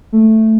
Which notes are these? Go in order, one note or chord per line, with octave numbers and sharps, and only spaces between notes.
A3